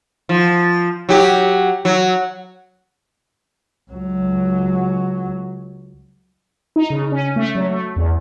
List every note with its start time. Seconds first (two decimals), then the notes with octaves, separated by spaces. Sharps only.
0.29 F3
1.09 F#3 G4
1.85 F#3
3.92 C#2 F#3
6.76 D#4
6.90 C#3
7.12 C#4
7.36 A3
7.55 F#3
7.70 A3
7.96 E2